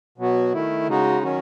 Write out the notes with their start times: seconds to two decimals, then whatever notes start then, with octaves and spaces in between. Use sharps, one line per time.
0.18 B2 F#3 B3 F#4
0.53 D#3 A3 E4
0.88 C#3 G#3 D#4 F#4
1.23 D#3 F#3 C#4 F#4